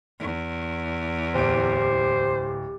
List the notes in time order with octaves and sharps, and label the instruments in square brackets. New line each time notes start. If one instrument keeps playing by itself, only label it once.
[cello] E2
[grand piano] D1 D7 [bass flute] G4 [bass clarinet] C5